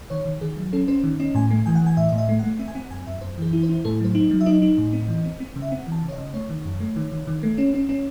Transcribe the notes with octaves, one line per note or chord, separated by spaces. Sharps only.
D#3 C#5
D#3
D#3 G#4
F#3
C#4 A4
C#4 C5
D#3
C#4 D#5
A2 G#5
A3
E3 G#5
F#5
E3
G#5
A2 E5
A2 D#5
E5
A3
A3 F#5
C4 E5
G#5
C4 F#5
F#2 G#5
F#2 E5
F#2 C5
E3 G#4
E4
C5
E4
A2 A4
F#3 C5
D#4
F#3
E5
D#4 D#5
D#4
A2
C4
E3
C4
C4
C#3
E5
C4 F#5
E3
A5
C#3
C#5
D#5
C#3
A3 C#5
D#3
F#2
A3
D#3
D#3
D#3
A3
C#4
C#4
C#4